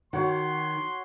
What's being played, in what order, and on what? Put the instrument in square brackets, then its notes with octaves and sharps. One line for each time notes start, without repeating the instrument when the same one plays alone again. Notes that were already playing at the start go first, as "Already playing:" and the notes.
[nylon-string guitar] D#3 [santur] F#4 C#5 [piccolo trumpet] C6